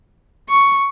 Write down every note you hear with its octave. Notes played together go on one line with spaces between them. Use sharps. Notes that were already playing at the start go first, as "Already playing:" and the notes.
C#6